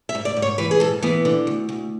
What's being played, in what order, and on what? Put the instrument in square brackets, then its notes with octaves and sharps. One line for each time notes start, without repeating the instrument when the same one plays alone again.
[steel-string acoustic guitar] E5
G#2
D5
G#2
C#5
E3 B4
G#4
G#2 A4
E3 B3
D3
D2
D2